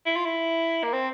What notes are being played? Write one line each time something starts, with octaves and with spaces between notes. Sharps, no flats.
E4
F4
E4
A#3
C4